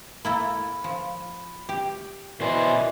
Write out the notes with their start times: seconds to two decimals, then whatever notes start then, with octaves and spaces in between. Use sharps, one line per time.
0.25 A#3 E4 A4 B5
0.84 F3
1.69 G4
2.40 B2 E3 A#4 C5 D5 D#5 G#5